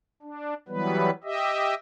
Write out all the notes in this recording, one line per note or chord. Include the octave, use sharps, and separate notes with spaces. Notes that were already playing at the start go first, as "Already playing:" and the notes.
D4
E3 F#3 G3 B3 B4
G4 D#5 E5